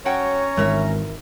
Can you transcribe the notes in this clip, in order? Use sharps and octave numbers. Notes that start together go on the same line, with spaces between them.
F#3 C#4 C#5 F#5 G5 A#5
G#1 E3 A#4 E5